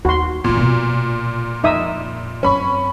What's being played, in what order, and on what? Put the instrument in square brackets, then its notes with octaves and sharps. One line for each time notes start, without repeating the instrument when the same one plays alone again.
[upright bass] D#2 [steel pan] F#4 C6
[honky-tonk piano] A#2 [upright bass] E3 A#3
[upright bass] B2 A#3
[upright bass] F2 [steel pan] D#4 E5 D#6
[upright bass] F#2 C4 [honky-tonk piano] C#4 B5 C#6